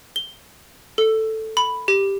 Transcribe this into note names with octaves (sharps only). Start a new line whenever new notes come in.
G7
A4
B5
G4